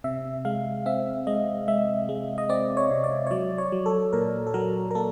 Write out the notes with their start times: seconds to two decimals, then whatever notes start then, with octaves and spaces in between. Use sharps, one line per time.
0.04 C3 E5
0.45 G#3 F5
0.86 C4 E5
1.27 G#3 D#5
1.68 G#3 E5
2.09 G#3
2.38 D#5
2.49 C4 D5
2.77 C#5
2.91 C3
3.04 D5
3.27 C#5
3.31 F#3 D5
3.58 C#5
3.72 F#3
3.86 A4
4.13 A#2 A#4
4.47 A4
4.54 F#3 A#4
4.91 A#4
4.95 A#3 A4